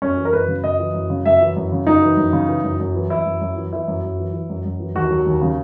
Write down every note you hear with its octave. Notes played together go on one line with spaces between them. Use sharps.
F#2 C#4
E3
A#4
F#2 B4
C#3
F#2 D#5
E3
F#2
C#3
F#2 E5
E3
F#2
C#3
F#2 D#4
E3
F#2
C#3
E3
F#2
F#2
E3
E3 E4
F#2
F#2
E3
E3 E4
F#2
F#2
E3
E3
F#2
F#2
E3
D#2 F#4
F#3
D#2
C#3